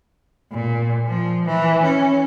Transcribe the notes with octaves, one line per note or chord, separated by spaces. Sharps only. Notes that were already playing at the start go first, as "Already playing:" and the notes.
A#2
F3
E3
C#4